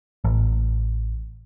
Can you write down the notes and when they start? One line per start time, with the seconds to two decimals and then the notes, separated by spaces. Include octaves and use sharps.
0.24 A1